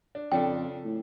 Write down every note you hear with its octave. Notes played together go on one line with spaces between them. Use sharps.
D4
F2 C#3 D4 A4 G5
A2